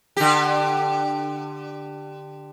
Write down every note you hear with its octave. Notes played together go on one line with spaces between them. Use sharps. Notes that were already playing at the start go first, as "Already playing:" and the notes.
D3 G4